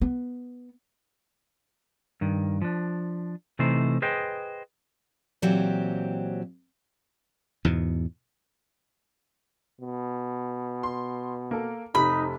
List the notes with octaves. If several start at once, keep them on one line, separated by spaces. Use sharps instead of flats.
B3
G2 D#3
F3 D4
C3 E3 A3 D#4 C5
G#4 B4 C5 D#5 G5
A#2 E3 F#3 C4 G4
E2 G#2 B2
B2
C6
A#3 A4
F1 C3 D#4 B5 B6